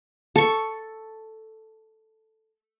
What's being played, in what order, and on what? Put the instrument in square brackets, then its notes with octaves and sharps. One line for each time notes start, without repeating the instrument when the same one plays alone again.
[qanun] A4 C#6